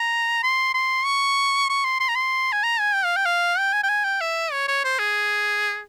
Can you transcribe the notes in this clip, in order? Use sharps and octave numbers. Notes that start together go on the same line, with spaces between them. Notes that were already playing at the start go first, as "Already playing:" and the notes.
Already playing: A#5
C6
C6
C#6
C#6
C6
C6
A#5
C6
G#5
A#5
G#5
G5
F5
G5
F5
G5
G#5
G5
G#5
G5
E5
C#5
C#5
C5
G#4